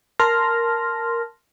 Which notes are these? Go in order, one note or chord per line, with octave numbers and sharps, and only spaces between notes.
A#4 A5 C6 F6 A#6